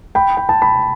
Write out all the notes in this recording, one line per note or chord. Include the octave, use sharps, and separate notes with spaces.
G5 B5
G5
A5
G5 B5